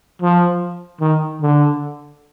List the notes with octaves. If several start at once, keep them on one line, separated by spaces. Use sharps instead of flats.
F3
D#3
D3